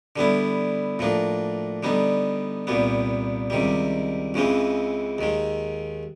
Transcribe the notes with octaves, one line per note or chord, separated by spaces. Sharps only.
D3 G3 B3 E4
A2 F3 A#3 D4
D3 G3 B3 D#4
C2 A#2 G3 B3
C#2 C3 D#3 G3
C#2 C#3 E3 G#3 C4
D#2 D#3 G#3